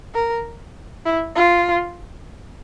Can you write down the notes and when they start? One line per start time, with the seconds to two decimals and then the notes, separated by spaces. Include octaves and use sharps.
0.15 A#4
1.05 E4
1.35 F4